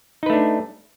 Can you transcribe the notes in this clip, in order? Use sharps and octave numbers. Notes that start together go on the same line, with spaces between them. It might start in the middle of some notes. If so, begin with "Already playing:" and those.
A3 D4 D#4 B4